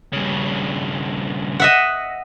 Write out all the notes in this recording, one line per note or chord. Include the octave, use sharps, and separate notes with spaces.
G2 C#3
D#5 E5 F#5